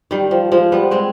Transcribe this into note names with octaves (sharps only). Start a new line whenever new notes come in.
D#3 G3
F3
F3 G#3
G3 B3
G#3 C4